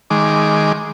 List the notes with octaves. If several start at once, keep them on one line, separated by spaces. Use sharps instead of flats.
D#3 G#3 D6